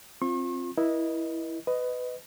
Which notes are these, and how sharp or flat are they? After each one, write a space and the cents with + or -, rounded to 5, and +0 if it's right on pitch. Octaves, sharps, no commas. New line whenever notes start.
C4 +15 F4 +0 C#6 -45
E4 +0 B4 -45 D#5 +0
B4 +20 D#5 +0